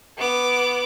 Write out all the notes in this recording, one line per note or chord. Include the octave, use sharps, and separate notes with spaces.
B3 D6